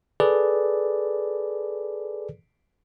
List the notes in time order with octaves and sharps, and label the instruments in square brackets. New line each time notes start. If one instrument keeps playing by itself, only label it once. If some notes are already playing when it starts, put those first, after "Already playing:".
[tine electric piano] G#4 A4 B4 D5